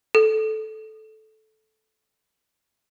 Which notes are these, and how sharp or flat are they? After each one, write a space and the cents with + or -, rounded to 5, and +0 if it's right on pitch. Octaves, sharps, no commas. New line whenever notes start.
A4 -15